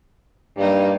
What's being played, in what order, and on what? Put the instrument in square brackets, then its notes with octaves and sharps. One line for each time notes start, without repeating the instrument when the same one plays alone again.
[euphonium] G2 [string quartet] G3 A#3 D#4